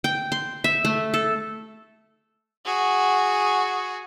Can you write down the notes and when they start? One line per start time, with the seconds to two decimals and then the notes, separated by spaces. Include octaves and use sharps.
0.04 G5
0.32 C6
0.64 E5
0.85 A3
1.14 A4
2.65 F#4 G#4